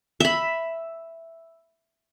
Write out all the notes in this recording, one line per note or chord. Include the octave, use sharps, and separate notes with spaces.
E5 B5